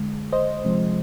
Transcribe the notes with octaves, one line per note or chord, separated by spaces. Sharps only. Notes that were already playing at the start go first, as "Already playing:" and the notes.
Already playing: D3 G#3
C5 D#5
C3 F3 G#3